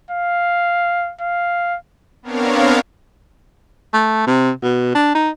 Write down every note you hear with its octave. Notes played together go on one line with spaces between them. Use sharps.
F5
F5
B3 C4 D4 A#4 C#5 F5
A3
C3
B2
D4
D#4